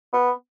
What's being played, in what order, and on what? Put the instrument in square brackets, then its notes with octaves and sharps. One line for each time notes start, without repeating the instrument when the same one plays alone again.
[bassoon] B3